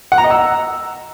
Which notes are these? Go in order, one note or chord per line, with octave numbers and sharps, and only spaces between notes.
F#5
A#5
D#5
E6